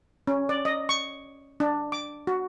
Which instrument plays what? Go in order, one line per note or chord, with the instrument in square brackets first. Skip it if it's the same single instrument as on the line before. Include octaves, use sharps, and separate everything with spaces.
[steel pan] C#4
D5
D#5
C#6
D4
D6
F#4